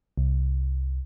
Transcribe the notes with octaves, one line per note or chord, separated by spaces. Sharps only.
C2